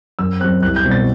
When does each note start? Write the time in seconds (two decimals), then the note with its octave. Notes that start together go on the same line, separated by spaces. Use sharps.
0.19 F#2 E6
0.40 F#3 C4 F#6
0.62 C2 F#6
0.76 G6
0.84 B2 G3 C4
0.91 A6